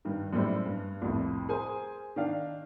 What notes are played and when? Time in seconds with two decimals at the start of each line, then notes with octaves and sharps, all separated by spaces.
0.05 G2 D#3
0.33 F#2 A2 G3 C5
0.66 G2
1.02 C2 F2 A2
1.49 G#4 A#4 C5 G#5
2.16 D#3 D4 F5